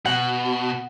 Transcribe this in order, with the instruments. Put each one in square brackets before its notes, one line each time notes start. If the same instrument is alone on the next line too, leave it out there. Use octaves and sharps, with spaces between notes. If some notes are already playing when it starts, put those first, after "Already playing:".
[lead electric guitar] B2 [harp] F#5